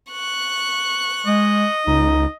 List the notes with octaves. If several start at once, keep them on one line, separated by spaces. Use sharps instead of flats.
C#6 F#6
G#3 D#5
C#2 D#4